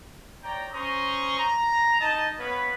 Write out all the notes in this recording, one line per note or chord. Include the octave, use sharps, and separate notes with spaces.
C#5 D5 G5 A#5
C#4 C5 A#5 C6 C#6 D#6
A#5
D#4 D#5 A5
B3 B4 C#5 F5 B5